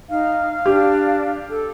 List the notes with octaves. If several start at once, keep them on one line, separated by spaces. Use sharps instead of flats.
D#4 F5
D4 G4
A4